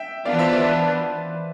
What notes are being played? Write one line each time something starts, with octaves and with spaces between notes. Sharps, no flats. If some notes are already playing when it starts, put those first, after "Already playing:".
Already playing: E5 G5
E3 B3 D4 F4 D5 F5
C5 E5
B4 D5